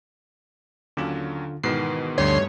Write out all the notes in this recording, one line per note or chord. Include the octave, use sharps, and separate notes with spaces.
D#2 D3 F#3 C#4 F4
G#2 B2 D#3 E3 B3 C7
D2 G2 G3 A3 C#5 C6